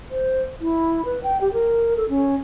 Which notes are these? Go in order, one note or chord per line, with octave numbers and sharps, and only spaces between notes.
C5
E4
B4
G5
G4
A#4
A4
C#4